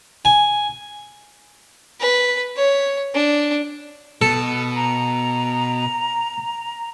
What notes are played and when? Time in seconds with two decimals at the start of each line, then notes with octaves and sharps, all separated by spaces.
0.25 G#5
2.00 B4
2.56 C#5
3.14 D4
4.22 B2 A4
4.76 A#5